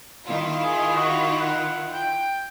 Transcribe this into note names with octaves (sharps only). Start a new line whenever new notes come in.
D#3 E4 F4
G#4
F#4
F#5
G5